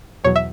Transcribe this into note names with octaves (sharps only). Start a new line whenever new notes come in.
E2 B2 F#3 C#5
E5